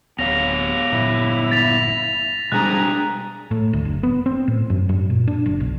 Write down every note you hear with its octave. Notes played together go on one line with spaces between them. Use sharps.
D1 B3 C#5 F5 A#6 F7
G1 A#2 E4
A6 B6 F7
B2 G3 G#3 D4 G#4 A#5 F#6
A2
D2
F#1
B3
C4
A2
F#2
F#2
A#2
D4
F#1
B1